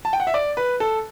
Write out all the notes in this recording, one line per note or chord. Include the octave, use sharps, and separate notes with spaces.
A5
G5
F#5
E5
D5
B4
A4